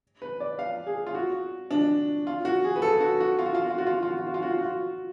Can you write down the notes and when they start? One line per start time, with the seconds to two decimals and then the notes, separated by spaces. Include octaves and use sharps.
0.22 B4
0.40 D5
0.59 F5
0.87 G#4
1.07 F4
1.15 F#4
1.71 D4
2.27 F4
2.45 F#4
2.64 G#4
2.76 B4
2.82 A4
3.01 F#4
3.20 F#4
3.39 F4
3.46 F#4
3.55 F4
3.62 F#4
3.70 F4
3.78 F#4
3.87 F4
3.94 F#4
4.03 F4
4.10 F#4
4.18 F4
4.27 F#4
4.34 F4
4.43 F#4
4.50 F4
4.58 F#4
4.65 F4